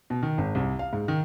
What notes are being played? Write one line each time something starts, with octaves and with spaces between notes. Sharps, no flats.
B2
D#3
G#1
C2
F5
G#2
D#3